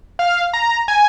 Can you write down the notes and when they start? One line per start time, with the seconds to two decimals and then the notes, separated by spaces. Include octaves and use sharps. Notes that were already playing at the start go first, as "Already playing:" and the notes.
0.19 F5
0.53 A#5
0.88 G#5